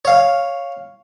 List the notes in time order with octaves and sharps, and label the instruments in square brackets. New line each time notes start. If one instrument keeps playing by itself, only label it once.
[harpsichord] C#5 F5